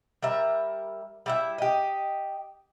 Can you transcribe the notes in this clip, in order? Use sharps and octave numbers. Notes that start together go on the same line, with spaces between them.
G3 A#4 E5
G3 E4 E5
G4 D#5